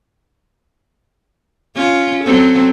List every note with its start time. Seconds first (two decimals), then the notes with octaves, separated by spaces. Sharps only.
1.75 C#4 F4
2.24 F#3 C4 A4